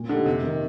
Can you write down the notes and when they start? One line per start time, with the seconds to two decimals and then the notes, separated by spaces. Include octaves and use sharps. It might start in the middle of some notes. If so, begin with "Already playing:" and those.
Already playing: A#2
0.09 D3 A3 D#4 G4
0.26 F2 C3
0.43 D#3 A#3